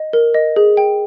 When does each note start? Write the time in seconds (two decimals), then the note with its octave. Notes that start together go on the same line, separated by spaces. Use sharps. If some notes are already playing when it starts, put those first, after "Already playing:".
Already playing: D#5
0.13 A#4
0.34 D#5
0.56 G#4
0.77 G5